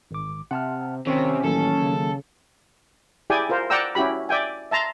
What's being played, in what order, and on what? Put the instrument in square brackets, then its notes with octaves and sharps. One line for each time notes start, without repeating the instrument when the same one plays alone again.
[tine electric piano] G#1 D6
[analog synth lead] C3 [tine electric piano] F#5 A5 F6
[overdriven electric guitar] C3 [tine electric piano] D#3 [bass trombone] C4 [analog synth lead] C#4
[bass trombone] A1 [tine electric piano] D#3 F#3 A#3 [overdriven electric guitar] A4
[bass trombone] C#3
[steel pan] E4 G4 G#4 D5 G5 G#5
F4 A#4 C5
D5 F#5 G5 A#5 E6
C#4 E4 F#4 G4 B5
D5 E5 G5 G#5
E5 A5 A#5 C6